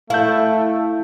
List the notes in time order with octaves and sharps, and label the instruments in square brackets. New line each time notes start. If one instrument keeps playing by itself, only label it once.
[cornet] A3 [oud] E4 [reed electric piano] F5 G6